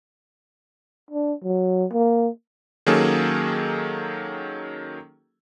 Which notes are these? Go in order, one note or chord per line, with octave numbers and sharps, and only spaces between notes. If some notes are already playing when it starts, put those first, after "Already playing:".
D4
F#3
A#3
D#3 F#3 A#3 C#4 G#4 A4